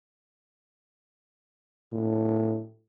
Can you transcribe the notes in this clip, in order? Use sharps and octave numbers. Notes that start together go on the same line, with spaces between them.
A2